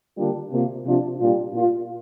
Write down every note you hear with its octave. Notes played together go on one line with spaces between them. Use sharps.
D3 G3 A#3 D4 F4
C3 A#3 F4
C3 F3 D4 F4
A#2 G3 D4 F4
A#2 A#3 F4